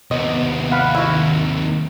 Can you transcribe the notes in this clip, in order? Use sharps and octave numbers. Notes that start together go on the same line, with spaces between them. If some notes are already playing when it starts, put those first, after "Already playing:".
D#2 C3 B3 D#5
F5 F#5 B5
D#3 E4 F#4